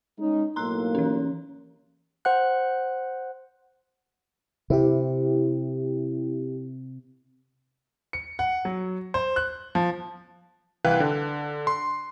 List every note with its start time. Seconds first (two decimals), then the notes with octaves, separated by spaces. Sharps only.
0.19 G#3 C#4 D#4
0.56 B1 A2 A#3 A#5 C6 F#6
0.95 E3 C#4
2.25 C5 F#5 F#6
4.70 C3 E4 G4
8.13 C#7
8.39 F#5
8.65 F#3
9.14 C5
9.36 F#6
9.75 F3
10.85 C2 E3 B4 F5 G5 F#6
11.00 D3
11.67 C6